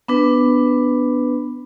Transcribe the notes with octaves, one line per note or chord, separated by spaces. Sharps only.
B3 D4 B4